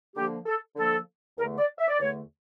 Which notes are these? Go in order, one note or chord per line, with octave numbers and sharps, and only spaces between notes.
D3 F3 A#3 G4
A4
D3 F3 A#3 A4
E2 D3 A3 A#4
D5
E5
D5
E2 D3 A3 C#5